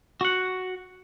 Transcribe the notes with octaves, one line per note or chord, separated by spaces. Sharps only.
F#4 F#5